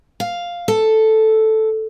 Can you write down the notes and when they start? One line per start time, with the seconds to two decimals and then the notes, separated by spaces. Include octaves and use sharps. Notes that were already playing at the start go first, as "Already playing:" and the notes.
0.20 F5
0.68 A4